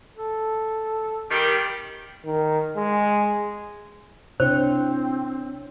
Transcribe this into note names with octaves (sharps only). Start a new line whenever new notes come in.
A4
D#3 G3
D#3
G#3
C3 C4 D4 E4 C5 C#5